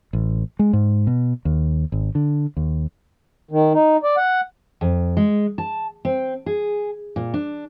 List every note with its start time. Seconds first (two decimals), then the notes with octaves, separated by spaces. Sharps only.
0.13 A1
0.59 G#3
0.73 G#2
1.07 B2
1.45 D#2
1.92 G#1
2.15 D3
2.57 D#2
3.51 D#3
3.74 D#4
4.03 D5
4.17 F#5
4.81 F2
5.17 G#3
5.58 A5
6.05 C4
6.46 G#4
7.16 A#2
7.34 D4